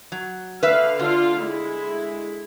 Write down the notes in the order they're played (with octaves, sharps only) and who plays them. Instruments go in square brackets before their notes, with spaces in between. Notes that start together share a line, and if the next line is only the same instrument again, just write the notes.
[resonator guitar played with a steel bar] F#3
[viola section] D3 F5 [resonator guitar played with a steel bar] B4 E5
[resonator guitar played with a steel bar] D3 [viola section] D4 F4 F5
[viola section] G#3 E4